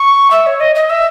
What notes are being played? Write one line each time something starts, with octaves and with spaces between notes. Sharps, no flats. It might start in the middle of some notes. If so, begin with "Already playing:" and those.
Already playing: C#6
E5
C#5
D#5
D#5
E5